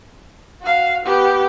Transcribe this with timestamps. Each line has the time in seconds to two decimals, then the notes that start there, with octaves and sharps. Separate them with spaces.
0.62 F#4 F5
1.05 B3 G4